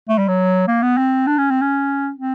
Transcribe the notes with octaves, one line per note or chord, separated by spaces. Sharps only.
A3
G3
F#3
A#3
B3
C4
D4
C#4
C4
C#4
C4